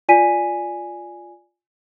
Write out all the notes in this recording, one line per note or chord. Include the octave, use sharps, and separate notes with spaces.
F4 D5 G#5 B6 D#7